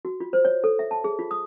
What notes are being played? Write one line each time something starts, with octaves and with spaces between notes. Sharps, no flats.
F#4
F4
C5
C#5
A4
E5
A5
G#4
F4
D#6